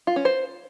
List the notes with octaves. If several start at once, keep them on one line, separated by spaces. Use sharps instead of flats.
F4
C#4
C5